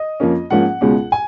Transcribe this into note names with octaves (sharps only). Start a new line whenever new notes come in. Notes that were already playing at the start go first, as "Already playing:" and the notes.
Already playing: D#5
F2 F3 A#3 C#4
G#2 F3 A#3 C#4 F#5
C#2 B2 G#3 C#4
G#5